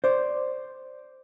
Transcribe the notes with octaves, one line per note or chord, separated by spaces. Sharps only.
C5 D5